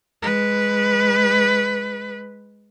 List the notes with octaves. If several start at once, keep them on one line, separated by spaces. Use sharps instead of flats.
G#3 B4